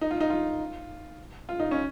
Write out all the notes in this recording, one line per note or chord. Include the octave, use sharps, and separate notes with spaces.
D#4
F4
D#4
F4
F4
D#4
C#4